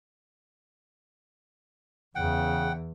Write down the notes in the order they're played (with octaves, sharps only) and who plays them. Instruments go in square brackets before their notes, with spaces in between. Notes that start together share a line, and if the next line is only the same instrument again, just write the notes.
[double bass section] E2 [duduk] C#3 [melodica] F#5 G5